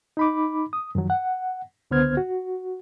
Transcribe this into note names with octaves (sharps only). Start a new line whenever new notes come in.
D#4 B5 D6
D#6
F#2 D#3 F3 F#3
F#5
C#2 D3 B3 C5 F6 G#6
F#4